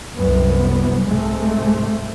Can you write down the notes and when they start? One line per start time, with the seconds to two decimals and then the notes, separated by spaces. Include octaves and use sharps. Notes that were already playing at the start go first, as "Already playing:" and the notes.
0.15 C2 F#2 B3
1.06 C2 G#2 C3 G#3 A3